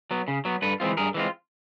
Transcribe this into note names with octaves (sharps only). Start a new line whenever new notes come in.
F#3 B3
C#3
F#3 B3
G2 A4 B4
E3 G#3 C4 F4
G2 G#4 A#4
E3 G#3 C4 F4